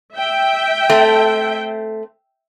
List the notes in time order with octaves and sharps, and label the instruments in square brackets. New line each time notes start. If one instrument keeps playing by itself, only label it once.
[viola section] E5 G5
[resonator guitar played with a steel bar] A3 C4